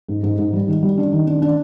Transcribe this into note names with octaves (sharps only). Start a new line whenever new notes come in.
G#2
G#2
G#2
G3
D#3
G3
D4
D#3
D4
D4